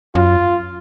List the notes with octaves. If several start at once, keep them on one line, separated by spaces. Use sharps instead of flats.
F#2 F4